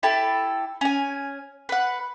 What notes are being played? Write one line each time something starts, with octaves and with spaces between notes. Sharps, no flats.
E4 G4 A4 A5
C#4 G#5
B4 F#5